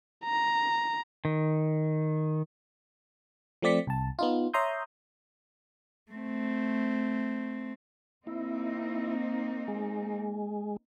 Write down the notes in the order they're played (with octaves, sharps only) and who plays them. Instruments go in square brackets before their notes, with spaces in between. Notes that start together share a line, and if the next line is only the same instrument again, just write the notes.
[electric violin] A#5
[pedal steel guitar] D#3
[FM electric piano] F3 A3 C4 D5 B6 C#7
C2 A5
B3 D#4 F4
C#5 E5 A#5 C6 D#6 G6
[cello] A3 C4
[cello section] A#3 C4 D#4 [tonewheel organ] E4
[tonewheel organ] G#3